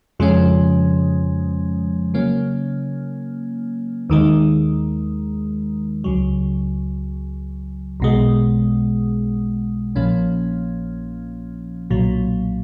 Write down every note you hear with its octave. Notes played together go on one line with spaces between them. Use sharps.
F2 C#3 F3 G#3 C#4
C#3 F#3 A#3 C#4
D#2 D#3 G#3
C#2 C#3 F#3
B1 B2 G#3
A#1 A#2 F3 A#3 C#4
B1 A#2 F#3